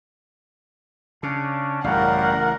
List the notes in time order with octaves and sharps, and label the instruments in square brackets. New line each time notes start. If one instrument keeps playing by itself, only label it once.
[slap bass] C#3 [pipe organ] C#4 D4
[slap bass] A1 C#3 [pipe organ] F#2 G3 F5 [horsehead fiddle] A#4 F#5